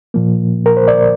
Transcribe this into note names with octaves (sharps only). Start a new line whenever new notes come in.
A#2 F3 A#3
A#4
C5
D5